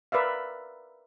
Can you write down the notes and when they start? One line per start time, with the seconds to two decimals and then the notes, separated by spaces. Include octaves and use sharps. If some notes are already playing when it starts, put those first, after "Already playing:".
0.12 A#4 B4 D5 E5 F5